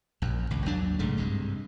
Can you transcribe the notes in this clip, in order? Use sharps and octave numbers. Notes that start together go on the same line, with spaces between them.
A#1 F#2
G#1 C#2
D#2 F#3 D4
B1 G#2 C#3 A3
G2 C3 G#3